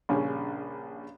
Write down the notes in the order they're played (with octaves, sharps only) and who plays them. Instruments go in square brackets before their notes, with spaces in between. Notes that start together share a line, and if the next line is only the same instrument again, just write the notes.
[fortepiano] A#1 G2 C#3 C#4